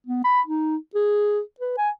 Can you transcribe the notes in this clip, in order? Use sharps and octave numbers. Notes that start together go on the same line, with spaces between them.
B3
B5
D#4
G#4
B4
G#5